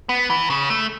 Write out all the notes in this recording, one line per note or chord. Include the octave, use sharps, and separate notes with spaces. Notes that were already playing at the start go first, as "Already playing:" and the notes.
B3
E3
C#3
A3